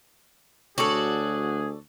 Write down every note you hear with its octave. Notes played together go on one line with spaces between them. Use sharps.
D2 F#4 G#4 A4 C#5 D5